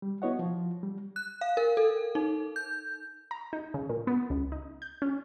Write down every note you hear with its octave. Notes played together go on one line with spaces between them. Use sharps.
G3
B3 E4 F#4 C#5 D#5 F#5
F3
G3
F#6
F5
A#4
A4
D#4
G6
A#5
D#4
C#3
A#2
B3
C#2
D#4
G6
C#4